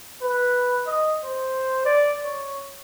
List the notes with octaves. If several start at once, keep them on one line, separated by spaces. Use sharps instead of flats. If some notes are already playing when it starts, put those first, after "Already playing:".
B4
D#5
C5
D5
C#5